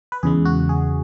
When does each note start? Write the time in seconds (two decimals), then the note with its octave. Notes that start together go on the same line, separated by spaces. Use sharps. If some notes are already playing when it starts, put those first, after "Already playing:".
0.12 B4
0.23 E2 C#3 G#3 G#4
0.45 F#4
0.69 G#4